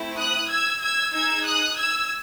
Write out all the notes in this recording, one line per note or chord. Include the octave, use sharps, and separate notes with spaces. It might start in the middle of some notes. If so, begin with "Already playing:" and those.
Already playing: A3 C4 E4
D#6 F#6
E6 G#6
E6 G#6
D#4 G#4 E6 G#6
D#6 F#6
E6 G#6